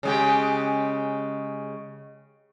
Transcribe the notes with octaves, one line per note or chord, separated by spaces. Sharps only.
C#3 G#3 G4